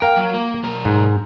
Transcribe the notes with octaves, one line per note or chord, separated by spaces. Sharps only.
A#4 F5 G5
F#3
A#3
B1 A#4
G#2